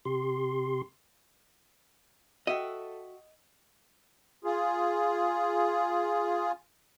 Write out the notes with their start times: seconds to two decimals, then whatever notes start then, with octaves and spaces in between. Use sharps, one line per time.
0.05 C3 G4 C6
2.47 F#4 A4 D#5 E5 G5
4.44 F4 G#4